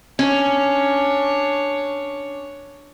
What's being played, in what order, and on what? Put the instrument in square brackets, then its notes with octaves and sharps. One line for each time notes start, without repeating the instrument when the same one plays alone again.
[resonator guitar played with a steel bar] C#4 [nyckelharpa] D4 C#5